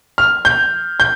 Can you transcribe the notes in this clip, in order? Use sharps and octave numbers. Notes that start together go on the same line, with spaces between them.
F6
G6
G6